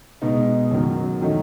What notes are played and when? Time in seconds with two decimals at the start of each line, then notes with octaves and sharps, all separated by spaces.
0.22 B2 G#3 B3 D#4
0.71 F#2 D#3 F#3
1.21 D#3 F#3 A3 D#4